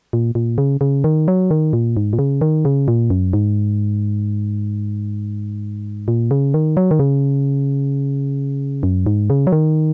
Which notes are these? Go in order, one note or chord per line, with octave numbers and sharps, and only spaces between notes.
A#2
A#2
C#3
C#3
D#3
F#3
D#3
A#2
G#2
A#2
C#3
D#3
C#3
A#2
F#2
G#2
A#2
C#3
D#3
F#3
D#3
C#3
F#2
G#2
C#3
F#3
D#3